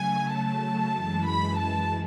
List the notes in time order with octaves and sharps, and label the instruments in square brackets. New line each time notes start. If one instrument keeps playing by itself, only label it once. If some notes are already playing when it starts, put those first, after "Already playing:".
Already playing: [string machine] C#3 F#3 A3 [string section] G#5
[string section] A5
[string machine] F#2 E3 G#3
[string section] B5
A5